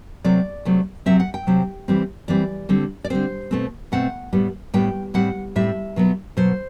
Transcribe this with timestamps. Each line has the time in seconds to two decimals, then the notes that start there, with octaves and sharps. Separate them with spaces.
0.24 C3 F#3 A3 C4 D5
0.65 C3 F#3 A3 C4
1.06 C3 F#3 C4 E5
1.20 F#5
1.34 G5
1.47 C3 F#3 C4
1.88 E3 G3 C4
2.28 E3 G3 C4 D5
2.69 D3 G3 C4
3.04 D5
3.10 D3 G3 C4 C5
3.51 B2 A3 C4
3.92 B2 A3 C4 F#5
4.33 A2 G3 B3
4.74 A2 G3 B3 G5
5.14 A2 G3 C4 F#5
5.56 A2 G3 C4 E5
5.96 B2 F#3 B3
6.37 B2 F#3 B3 C5